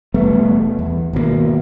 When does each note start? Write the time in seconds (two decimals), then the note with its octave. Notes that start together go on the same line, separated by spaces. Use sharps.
0.14 E1 G3 A3 B3
0.79 E2
1.13 G#1 B2 D#3 A#3